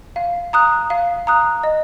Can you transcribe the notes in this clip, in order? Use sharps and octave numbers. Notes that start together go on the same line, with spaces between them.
F5
A#5 D#6 F#6
F5
A#5 D#6 F#6
D#5